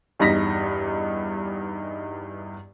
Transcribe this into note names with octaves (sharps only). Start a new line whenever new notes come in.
E2 G2 D#4 A#6 B6